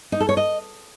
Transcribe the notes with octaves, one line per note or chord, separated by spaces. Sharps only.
D#4
A4
C#5
D#5